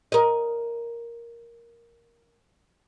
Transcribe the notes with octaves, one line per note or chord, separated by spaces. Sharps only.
A#4 D#5